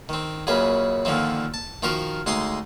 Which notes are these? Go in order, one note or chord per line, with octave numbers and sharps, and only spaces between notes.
D#3 C4
F#2 A#2 C#3 G#4 B4
A#2 D3 D#3 F3 C4
A5
D#3 F3 F4 F#4 A#4
D2 G#3 D#4 C6 D#6